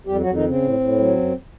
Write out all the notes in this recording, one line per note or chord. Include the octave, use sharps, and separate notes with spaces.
F2 G3 G4
F#3 F#4
F2
D#3 D#4
C#3 C4
A2
A2
F#3
F#2